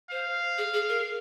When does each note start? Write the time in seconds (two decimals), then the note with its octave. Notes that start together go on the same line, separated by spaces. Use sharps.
0.11 C5 F5
0.58 G#4
0.74 G#4
0.89 A#4